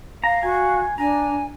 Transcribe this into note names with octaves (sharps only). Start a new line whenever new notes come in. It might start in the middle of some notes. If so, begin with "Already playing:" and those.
F5 A#5
F#4 G#5
D4 G#5 A#5